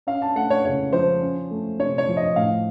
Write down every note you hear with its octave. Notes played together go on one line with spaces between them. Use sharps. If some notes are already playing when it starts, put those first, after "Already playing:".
C#4 F5
A5
A3 F#5
C#5
C#3 C#5
F3 C5
C#4
A3
C3 C#5
C#5
F3
D#5
A2 F5